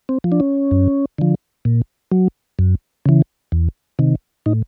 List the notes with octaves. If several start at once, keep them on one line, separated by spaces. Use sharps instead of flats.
C4
F3
D4
C#4
F#2
D3 F3
A#2
F#3
F#2
C#3 E3
E2
C3 D#3
A2 D#4